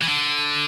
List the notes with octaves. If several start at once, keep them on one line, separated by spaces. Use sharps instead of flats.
E3
D3